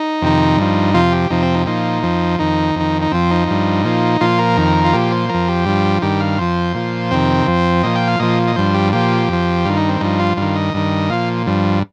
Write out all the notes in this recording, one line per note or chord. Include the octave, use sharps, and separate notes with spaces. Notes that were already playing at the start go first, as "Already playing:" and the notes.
Already playing: D#4
F2 C3 D#3
G2 F3
F2 C3 F3 F4
G4
F2 C3 F3 D#4
C4
D#4
A#2 F3 D#4
F2 F3
F2 D#3 D#4
F2 D#3
D#4
F2 F3 C4
D#4
G2 F3
A#2 F3
A#2 F3 F4
A#4
F2 D#3
F4
A#2 F3 G4
C5
F2 F3 A#4
G4
G2 F3
G2 D#3 G4
F5
F2 F3 C5
A#2 F3
F2 C3 D#3 C4
F2 F3
A#2 F3 D#5
G5
F5
A#2 F3 D#5
D#5
G2 F3 C5
G4
A#2 F3 G4
F2 F3
G2 D#3 F4
D#4
C4
G2 F3 D#4
F4
G2 D#3 F4
D#5
G2 D#3
A#2 F3 F5
G2 F3